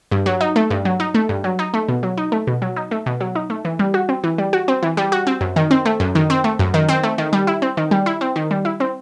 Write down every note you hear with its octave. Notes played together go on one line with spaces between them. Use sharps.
G2
F#3
D#4
A3
G2
F#3
D#4
A3
G2
F#3
D#4
A3
B2
F#3
D#4
A3
B2
F#3
D#4
A3
B2
F#3
D#4
A3
E3
G3
F#4
C4
E3
G3
F#4
C4
E3
G3
F#4
C4
F#2
D#3
C4
A3
F#2
D#3
C4
A3
F#2
D#3
C4
A3
D#3
G3
E4
C4
D#3
G3
E4
C4
D#3
G3
E4
C4